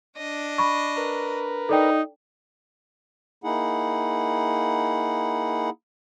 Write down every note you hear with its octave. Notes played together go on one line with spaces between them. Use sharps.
D4 D#5
B5 C#6
A#4 B4
D#4 A4 D5 G5
A#3 D#4 E4 G#4 F#5